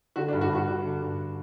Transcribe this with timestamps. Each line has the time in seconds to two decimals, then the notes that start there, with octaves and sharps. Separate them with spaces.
0.16 D3 F#4
0.28 D4
0.33 G2
0.41 F#4
0.50 G2
0.55 F#4
0.67 D3 F#4
0.84 D3
1.01 G2